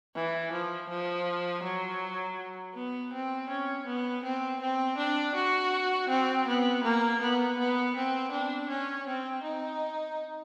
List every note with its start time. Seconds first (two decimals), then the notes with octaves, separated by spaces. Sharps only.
0.15 E3
0.52 F3
0.89 F3
1.63 F#3
2.75 B3
3.13 C4
3.49 C#4
3.86 B3
4.23 C4
4.61 C4
4.97 D4
5.35 F#4
6.09 C4
6.47 B3
6.84 A#3
7.21 B3
7.58 B3
7.96 C4
8.32 D4
8.69 C#4
9.07 C4
9.43 D#4